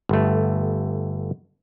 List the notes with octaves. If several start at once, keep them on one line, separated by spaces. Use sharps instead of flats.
G1 A3